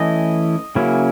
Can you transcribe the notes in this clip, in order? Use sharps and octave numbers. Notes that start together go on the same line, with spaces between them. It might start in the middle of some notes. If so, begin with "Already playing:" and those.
Already playing: E3 A3 C#4 E4 D#5
C#3 F#3 A#3 C#4 E4